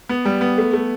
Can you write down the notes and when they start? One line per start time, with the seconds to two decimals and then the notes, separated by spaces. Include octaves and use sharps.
0.09 B3
0.25 G3
0.41 B3
0.58 A3
0.73 A3